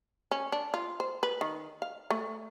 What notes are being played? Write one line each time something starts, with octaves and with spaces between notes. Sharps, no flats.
C#4
D4
F4
C5
B4
D#3
F5
A3